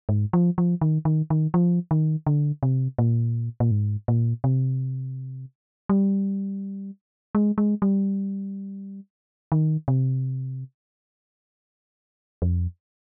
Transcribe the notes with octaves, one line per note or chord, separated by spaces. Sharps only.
G#2
F3
F3
D#3
D#3
D#3
F3
D#3
D3
C3
A#2
A#2
G#2
A#2
C3
G3
G#3
G#3
G3
D#3
C3
F2